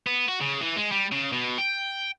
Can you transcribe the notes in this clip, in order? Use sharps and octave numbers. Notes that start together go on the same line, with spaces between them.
B3
F#4
C#3
E3
G#3
G3
C#3
B2
G5